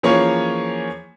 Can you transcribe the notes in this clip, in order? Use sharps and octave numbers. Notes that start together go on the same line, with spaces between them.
E3 F3 A#3 C#4 G#4 C#5